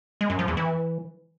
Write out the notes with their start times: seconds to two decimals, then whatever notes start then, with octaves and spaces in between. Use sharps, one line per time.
0.21 G#3
0.30 F#2
0.39 F3
0.48 E2
0.57 E3